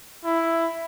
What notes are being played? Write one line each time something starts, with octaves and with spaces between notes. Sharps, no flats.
E4